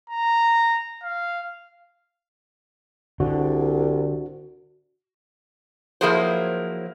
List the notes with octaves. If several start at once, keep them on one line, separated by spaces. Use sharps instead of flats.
A#5
F5
C2 D3 F#4
F3 F#3 A#3 E4 G#4 C5